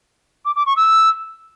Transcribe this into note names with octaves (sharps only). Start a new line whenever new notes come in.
D6
D6
C#6
E6